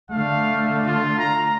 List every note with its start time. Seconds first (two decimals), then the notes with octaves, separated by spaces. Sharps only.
0.11 D3 A3 F5
0.87 F4
1.19 A#5